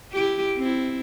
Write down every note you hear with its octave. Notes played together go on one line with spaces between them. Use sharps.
E4 G4
C4 E4